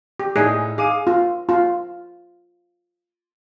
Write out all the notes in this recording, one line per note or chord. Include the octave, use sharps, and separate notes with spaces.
G4
A2 D#4 G#4 D5 G#5
G#4 F5 D6 D#7
F4
F4